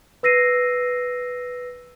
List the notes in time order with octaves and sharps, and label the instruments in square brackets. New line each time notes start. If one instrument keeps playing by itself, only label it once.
[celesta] B4 E6 A#6 C7 D#7